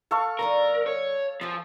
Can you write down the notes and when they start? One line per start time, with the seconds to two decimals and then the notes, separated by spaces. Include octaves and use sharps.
0.11 A4 F5 C#6
0.39 D3 G3 D#4 A#4
0.87 C#5
1.41 F3 C4 F4 G#4